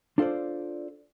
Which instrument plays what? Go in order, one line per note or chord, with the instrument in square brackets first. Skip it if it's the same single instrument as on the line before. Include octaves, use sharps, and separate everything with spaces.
[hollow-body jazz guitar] D4 F4 A4 C5 D5